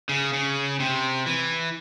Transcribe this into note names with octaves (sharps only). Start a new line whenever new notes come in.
C#3
C#3
C3
E3